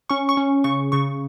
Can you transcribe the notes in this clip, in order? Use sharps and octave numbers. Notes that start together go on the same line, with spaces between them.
C#4 C#6
C#6
C#4
C#3 C#6
C#3 C#6